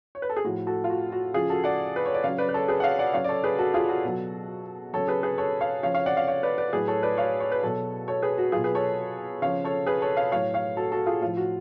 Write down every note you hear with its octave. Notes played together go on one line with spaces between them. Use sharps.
C#5
B4
A4
G#4
A2 F3 F#4
F#4 A4
F4
F#4
F#4
C#3 F3 F4 G#4
F#4 A4
D5 F#5
B4
C#5
D5
C#3 F#3 C#5 F5
B4 D5
B4
A4 C#5
G#4 B4
F#5
C#5 F5
D5 F#5
C#3 F#3 C#5 F5
D5
A4 C#5
G#4 B4
F#4 A4
F4 G#4
F#4 A4
B2 F#3
C#3 F#3 A4 C#5
G#4 B4
G#4 B4
A4 C#5
C#5 F5
C#3 F3 C#5 F5
C#5 F5
D5 F#5
C#5 F5
C#5 F5
B4 D5
B4 D5
A2 F#3 G#4 B4
A4 C#5
B4 D5
C#5 F5
C#5
B4
B2 F#3 A4 C#5
A4 C#5
G#4 B4
F#4
B2 F#3 F4 G#4
G#4 B4
A4 C#5
C#3 F3 C#5 F5
A4 C#5
G#4 B4
A4 C#5
C#5 F5
A2 F#3 C#5 F5
C#5 F5
F#4 A4
F#4 A4
F4 G#4
A2 F3 F4
F#4